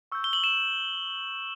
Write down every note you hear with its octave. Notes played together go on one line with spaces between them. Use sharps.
C#6 E6 G6
G7
F#7
E7